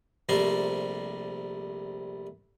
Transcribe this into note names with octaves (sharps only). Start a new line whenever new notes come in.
A#1 C3 G3 A3 A#5 C6